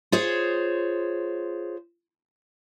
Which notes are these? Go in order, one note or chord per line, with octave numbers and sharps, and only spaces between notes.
F4 G#4 C5 C#5